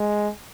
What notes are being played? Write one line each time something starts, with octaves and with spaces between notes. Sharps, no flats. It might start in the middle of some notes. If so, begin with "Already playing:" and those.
Already playing: G#3